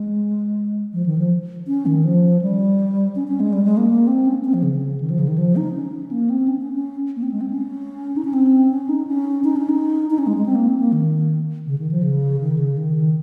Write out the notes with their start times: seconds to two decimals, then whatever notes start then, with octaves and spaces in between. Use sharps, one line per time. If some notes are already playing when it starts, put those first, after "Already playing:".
Already playing: G#3
0.93 F3
1.06 D#3
1.18 F3
1.67 C#4
1.86 D#3
2.04 F3
2.42 G3
3.16 C#4
3.28 C#4
3.40 G#3
3.53 G3
3.65 G#3
3.77 A#3
3.89 A#3
4.07 C4
4.26 C#4
4.45 C4
4.54 F3
4.63 C#3
5.00 D#3
5.10 F3
5.19 C#3
5.28 D#3
5.38 F3
5.56 D#4
5.75 C#4
6.11 A#3
6.30 C4
6.48 C#4
6.61 C#4
6.73 C#4
7.16 A#3
7.23 C4
7.32 G#3
7.41 C4
7.50 C#4
8.16 D#4
8.25 C#4
8.33 C4
8.70 C#4
8.89 D#4
9.07 C#4
9.44 D#4
9.56 C#4
9.69 D#4
10.10 D#4
10.18 C#4
10.27 G#3
10.37 G#3
10.46 C4
10.55 A#3
10.68 C4
10.80 A#3
10.92 D#3
11.66 C#3
11.78 D#3
11.91 F3
12.03 C#3
12.41 D#3
12.59 C#3
12.78 D#3